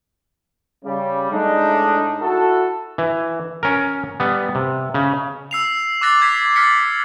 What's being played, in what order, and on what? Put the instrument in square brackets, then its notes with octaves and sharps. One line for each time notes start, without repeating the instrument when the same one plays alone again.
[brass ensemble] C#3 G3
A2 G#3 A3 D4 D#4
E4 F#4 A4
[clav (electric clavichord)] E3
C#4 A#4
G3 B3
C3
C#3
[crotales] E6 C7 F7
D6 E6 F#6 A6 A#6 C7
G#6 B6 C7 F7
F6 A6 B6 C#7